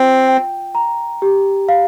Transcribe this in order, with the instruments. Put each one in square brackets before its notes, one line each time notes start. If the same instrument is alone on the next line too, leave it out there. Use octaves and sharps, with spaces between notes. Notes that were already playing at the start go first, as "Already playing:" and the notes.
Already playing: [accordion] C4 [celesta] F4
[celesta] G5
A#5
G4
F5